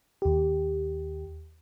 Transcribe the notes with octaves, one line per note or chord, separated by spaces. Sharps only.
D#2 G4